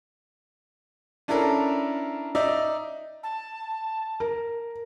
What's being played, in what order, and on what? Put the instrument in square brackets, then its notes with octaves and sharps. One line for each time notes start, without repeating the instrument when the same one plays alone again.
[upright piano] C#4 D4 E4 A4 A#4
D#4 D5 E5
[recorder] A5
[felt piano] A#4